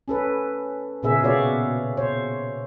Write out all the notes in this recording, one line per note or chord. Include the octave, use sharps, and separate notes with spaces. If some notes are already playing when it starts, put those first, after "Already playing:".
C#4 A4 B4
A#2 C#3 B3 G#4 A#4 E5
B2 B3 F#4 C#5 D5 F5
C5 C#5